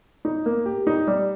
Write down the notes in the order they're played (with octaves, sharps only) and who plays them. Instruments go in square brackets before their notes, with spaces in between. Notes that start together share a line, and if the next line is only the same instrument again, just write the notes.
[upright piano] D#4
A#3
G4
D#4
G3